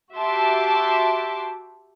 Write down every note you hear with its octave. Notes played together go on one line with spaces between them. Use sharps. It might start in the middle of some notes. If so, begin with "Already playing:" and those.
F#4 G4 E5 A5 C6 D6